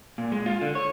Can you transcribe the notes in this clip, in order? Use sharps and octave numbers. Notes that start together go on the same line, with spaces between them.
A#2
G#3
F4
D3
C#5